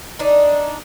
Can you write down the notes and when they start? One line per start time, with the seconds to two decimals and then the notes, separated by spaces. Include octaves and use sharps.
0.19 D4 D#4